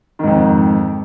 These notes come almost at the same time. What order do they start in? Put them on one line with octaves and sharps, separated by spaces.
D#3 G#2 F2